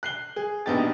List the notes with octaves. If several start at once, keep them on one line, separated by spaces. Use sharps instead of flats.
F#6 C7 G7
G#4
E1 A#1 B3 D#4 G4 A6